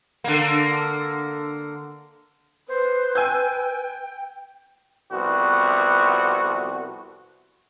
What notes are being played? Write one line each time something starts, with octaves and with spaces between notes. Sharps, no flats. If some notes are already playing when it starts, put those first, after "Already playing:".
D3 A#3
B4 C5
G5 G#5 E6 G6
C2 F2 B3 F#4 B4